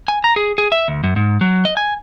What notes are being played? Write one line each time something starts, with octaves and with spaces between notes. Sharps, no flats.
G#5
A#5
G#4
G#4
E5
D2
F#2
G#2
F#3
D#5
G#5